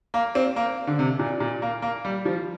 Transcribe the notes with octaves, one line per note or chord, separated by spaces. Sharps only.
A#3
C4
A#3
D3
C3
A#2
A#2
A#3
A#3
G3
F3